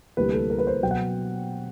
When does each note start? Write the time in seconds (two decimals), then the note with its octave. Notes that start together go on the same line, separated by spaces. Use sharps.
0.17 D2 C3 E3 G3 A#3 B4
0.34 A4
0.50 A#4
0.59 B4
0.67 C5
0.83 B2 F#3 G5
0.91 F#5